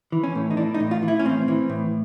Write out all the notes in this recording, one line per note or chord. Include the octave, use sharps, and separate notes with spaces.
E3
C#4
A2
D#4
E3 D4
D#4
A2
F4
E3
E4
C#4
A2 C4
E3
A2